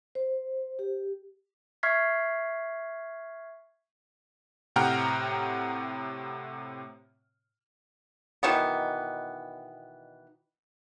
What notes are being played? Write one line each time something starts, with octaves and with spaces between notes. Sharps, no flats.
C5
G4
E5 C#6 F6 G#6 B6 C7
A2 C3 F#5 G5 A#5 F6
B2 D#3 E3 B3